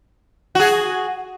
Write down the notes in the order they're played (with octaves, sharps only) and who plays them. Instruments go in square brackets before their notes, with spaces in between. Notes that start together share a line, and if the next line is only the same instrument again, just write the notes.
[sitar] F#4 G#4